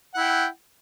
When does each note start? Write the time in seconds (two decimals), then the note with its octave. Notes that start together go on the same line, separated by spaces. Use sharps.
0.14 F#5
0.17 E4
0.20 G5